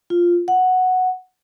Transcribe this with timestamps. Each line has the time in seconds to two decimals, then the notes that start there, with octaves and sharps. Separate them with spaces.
0.10 F4
0.48 F#5